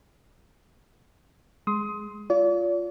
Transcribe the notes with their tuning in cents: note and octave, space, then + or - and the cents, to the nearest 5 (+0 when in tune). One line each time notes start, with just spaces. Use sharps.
G#3 +0 C6 +0 D#6 +25
F4 +0 D5 -40